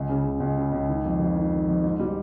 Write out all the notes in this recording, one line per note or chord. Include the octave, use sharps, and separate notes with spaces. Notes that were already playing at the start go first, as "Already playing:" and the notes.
Already playing: C#2
C#3
C#3
C#2
C#3
C#2
D#3
F2
F2
D#3
D#3
F2
G#2
G3